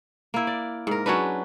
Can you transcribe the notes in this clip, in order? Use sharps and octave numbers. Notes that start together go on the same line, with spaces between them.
A#3 E4
D5
G#2 A#4
F#3 C#4 D4 B4